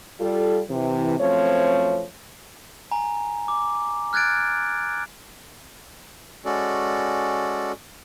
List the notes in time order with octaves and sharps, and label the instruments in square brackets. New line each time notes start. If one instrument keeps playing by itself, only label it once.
[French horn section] G3 F4 A4
C3 E3
F#2 F3 A3 C4 C#5
[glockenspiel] G#5 A#5
D6
F6 F#6 G#6 A6 D7
[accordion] G#3 C#4 F#4 A4 D5